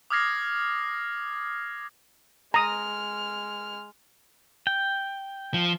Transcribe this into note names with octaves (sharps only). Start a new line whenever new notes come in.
D6 D#6 F6 G#6 A#6 C7
G#3 A#5 D#6 F6
G5
F3